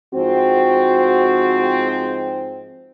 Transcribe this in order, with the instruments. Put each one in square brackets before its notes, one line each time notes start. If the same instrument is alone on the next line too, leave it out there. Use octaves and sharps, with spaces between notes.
[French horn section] G#2 F3 C4 [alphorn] F#4